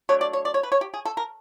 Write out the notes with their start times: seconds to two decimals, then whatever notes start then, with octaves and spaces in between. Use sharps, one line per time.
0.09 F#3 A3 D4 C#5
0.21 D5
0.33 C#5
0.45 D5
0.54 C#5
0.63 B4
0.72 C#5
0.81 G4
0.94 G#4
1.05 A4
1.17 A#4